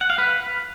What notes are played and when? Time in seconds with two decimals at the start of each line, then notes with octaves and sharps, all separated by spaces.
0.01 F#5
0.10 F5
0.18 B4